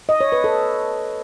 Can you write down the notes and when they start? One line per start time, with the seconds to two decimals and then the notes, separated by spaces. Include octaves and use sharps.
0.09 D#5
0.21 C#5
0.32 B4
0.44 A4